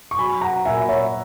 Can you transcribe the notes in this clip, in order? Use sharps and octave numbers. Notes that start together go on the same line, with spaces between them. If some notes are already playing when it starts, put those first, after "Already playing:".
C#6
F#3 G#5 B5
F#5 A#5
A#2 E5 G#5
C#5 E5